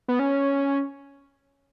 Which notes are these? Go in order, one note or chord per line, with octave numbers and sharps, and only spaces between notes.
B3
C#4